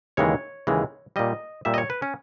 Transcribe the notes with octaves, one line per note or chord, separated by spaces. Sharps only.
D#2 C#3 E3 G#3 C#5
D#2 C#3 E3 G#3
A#2 G3 D#5
A#2 G3 E5
D#5
C#5
B4
C#4